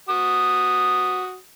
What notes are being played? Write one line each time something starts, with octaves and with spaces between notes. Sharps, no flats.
F#4 D#6